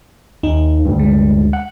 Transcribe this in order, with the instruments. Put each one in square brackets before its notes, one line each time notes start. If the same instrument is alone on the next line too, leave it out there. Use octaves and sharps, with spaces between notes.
[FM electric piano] D#2 D#4
[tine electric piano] D2 G2
[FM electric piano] G#3
[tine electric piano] F#5